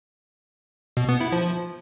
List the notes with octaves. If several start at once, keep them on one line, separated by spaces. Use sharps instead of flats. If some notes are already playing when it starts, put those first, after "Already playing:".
B2
B3
E4
F3